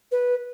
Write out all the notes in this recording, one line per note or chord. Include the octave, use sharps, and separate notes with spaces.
B4